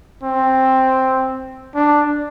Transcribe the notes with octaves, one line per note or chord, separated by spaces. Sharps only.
C4
D4